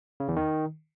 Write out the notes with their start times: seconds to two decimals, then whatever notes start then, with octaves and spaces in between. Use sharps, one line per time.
0.20 C#3
0.28 E2
0.36 D#3